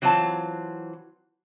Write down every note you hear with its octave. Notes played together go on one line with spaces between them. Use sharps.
E3 F#3 C4 F4 A5